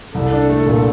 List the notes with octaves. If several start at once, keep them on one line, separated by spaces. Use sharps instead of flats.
C2 A4
D4
A3
A#2